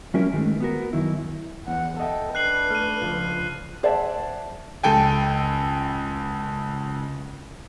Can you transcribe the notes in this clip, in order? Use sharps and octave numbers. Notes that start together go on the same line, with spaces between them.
F#3 G#3 C#4 E4 F#4 A#4
G2 D#3 G#3 A3
B3 F#4 A#4
F#2 D#3 E4
E2 F#5
A4 D#5 E5 G5
D4 B4 F#6 C7 F#7
A3 F6 D#7
C#2 F3
G#4 C5 D5 E5 F#5 A5
C#2 A4 G5 G#5